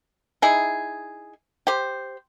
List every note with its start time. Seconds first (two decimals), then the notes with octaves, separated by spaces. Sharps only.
0.42 D#4 E4 G#4
1.67 G4 C5